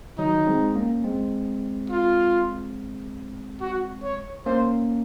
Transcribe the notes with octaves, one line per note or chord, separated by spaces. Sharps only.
D#3 F#3 D#4
G#3 C4
A#3 C#4
G#3 C4
F4
F#4
C#5
A#3 C#4 C5